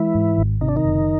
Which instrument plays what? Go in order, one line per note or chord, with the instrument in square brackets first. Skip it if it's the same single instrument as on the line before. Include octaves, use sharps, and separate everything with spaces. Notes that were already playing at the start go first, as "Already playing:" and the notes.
Already playing: [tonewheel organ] E3 E4 [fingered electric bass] G#3
[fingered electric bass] G#2
G#1
[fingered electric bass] C3 [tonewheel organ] D#4
[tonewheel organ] D4
D#3 D#4
[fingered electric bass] F#1